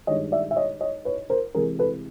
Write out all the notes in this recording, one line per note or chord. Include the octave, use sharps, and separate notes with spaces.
G2 D#3 G#3 C#5 D#5
D5 E5
E5
C#5 D#5
C#5 D#5
B4 C#5
A#4 C5
C3 E3 G#3 G#4 A#4
A4 B4